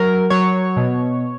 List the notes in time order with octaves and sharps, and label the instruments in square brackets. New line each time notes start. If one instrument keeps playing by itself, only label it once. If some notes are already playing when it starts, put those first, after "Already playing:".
Already playing: [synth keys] F#3 A#4
F#3 C#5
B2